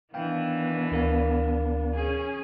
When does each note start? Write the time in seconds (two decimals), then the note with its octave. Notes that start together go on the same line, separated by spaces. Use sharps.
0.14 D#3 E3 B3 D4 F5 G5
0.91 D2 A#4 F5
1.95 C#4 G#4 G#5